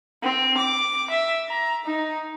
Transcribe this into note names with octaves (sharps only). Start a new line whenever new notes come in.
C4
D6
E5
A#5
D#4